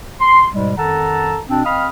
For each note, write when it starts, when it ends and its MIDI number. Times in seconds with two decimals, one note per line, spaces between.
0.20 0.45 84
0.52 0.72 44
0.52 0.72 47
0.52 0.72 55
0.52 0.72 56
0.76 1.39 41
0.76 1.39 51
0.76 1.39 69
0.76 1.39 78
0.76 1.39 81
0.76 1.39 82
1.48 1.61 47
1.48 1.61 60
1.48 1.61 62
1.64 1.88 60
1.64 1.88 75
1.64 1.88 77
1.64 1.88 83
1.64 1.88 87
1.64 1.88 89